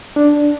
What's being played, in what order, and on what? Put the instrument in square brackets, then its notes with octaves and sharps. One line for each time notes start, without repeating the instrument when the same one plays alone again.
[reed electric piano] D4